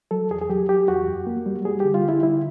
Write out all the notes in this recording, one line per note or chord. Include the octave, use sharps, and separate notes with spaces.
F#3 A4
E2 G#4
G#4
F#3 G4
F#3 G4
E2 F#4
F#2
A#3
G3
G3 G#4
D3 G4
F4
D3 E4
D3 E4